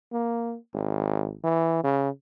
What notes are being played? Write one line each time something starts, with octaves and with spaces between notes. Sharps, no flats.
A#3
G#1
E3
C#3